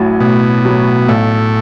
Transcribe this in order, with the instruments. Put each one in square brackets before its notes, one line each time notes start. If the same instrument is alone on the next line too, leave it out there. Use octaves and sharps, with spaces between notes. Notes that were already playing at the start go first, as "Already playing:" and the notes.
Already playing: [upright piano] A1 A2 F#3
[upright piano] A1 [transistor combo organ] B2
[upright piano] A2 F#3
[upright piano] B1 [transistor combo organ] A2